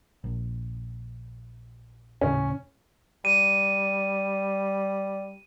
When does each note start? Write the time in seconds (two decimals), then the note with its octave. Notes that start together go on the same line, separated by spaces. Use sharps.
0.24 A#1
2.21 D#1 A2 C#3 C#4
3.25 G3 D#7